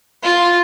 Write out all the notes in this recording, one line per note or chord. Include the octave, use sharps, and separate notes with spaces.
F4